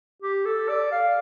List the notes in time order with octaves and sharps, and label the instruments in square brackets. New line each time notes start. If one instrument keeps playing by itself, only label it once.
[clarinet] G4
A4
D5
F5